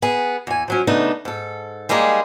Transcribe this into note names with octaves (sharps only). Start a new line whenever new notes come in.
B3 G#4
E2 G#5
F3 F#3 C#4
C#3 A3 B3 D4 D#4
G#2 A4
G3 G#3 A#3 D#4 G#4